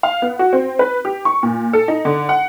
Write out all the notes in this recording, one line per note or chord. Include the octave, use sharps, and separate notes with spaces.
F5
B3
F#4
C4
B4
G4
C#6
A#2
A4
D#4
D3
F#5